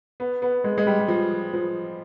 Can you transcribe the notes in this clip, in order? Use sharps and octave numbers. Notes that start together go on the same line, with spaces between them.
B3
B3
G#3
G#3
G3
G3
F3
F3